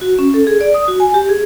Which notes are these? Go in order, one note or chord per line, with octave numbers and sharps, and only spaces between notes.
F#4
C#4
A4
G#4
D5
D#6
F#4
G#5
G4
G#4